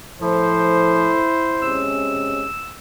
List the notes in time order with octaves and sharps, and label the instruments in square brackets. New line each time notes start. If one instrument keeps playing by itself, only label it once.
[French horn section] A2 A4 [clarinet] F3 [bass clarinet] E4 [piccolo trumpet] C5
[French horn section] C3 G#3 C#4 [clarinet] E6